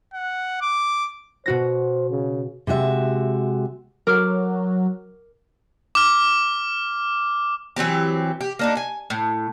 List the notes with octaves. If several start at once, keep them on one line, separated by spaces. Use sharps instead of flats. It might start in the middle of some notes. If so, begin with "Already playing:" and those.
F#5
D6
B2 F#4 C5 A#6
C#3
C3 G#3 F#4 E5
F#3 A#4 D6 F6
D6 F6
E3 F#3 C4 G4
G4
A#3 D4 D#4
G#5
A2